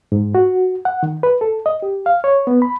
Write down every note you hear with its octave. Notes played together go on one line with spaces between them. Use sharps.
G#2
F#4
F#5
D#3
B4
A4
D#5
G4
F5
C#5
B3
B5